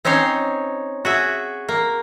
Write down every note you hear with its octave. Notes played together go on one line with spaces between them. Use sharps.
C4 C#4 D#4 C5 C#5
F#4 G#4 E5
A#3